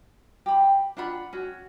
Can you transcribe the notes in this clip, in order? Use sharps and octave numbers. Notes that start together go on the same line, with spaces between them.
G4 B5
D4 F4 F#5 B5
C#4 F#4